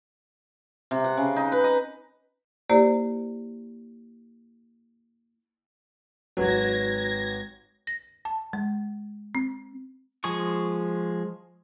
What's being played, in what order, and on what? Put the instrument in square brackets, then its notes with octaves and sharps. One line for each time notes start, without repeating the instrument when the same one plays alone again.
[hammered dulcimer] C3
F#5
C#3
D#4
B4
D#5
[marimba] A#3 E4 G4 C5 D5
[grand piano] G#1 B4 C#5 [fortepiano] F#3 F#4 [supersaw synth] G#6 A#6
[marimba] A#6
A5
G#3
C4
[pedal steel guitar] F3 G#3 G#4 C#6